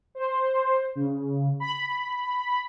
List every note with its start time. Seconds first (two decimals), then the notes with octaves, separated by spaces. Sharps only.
0.15 C5
0.95 C#3
1.60 B5